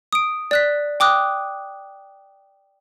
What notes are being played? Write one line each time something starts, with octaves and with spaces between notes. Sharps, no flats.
D#6 D7
D5 F#6 B6
G5 D6 D#6 F#6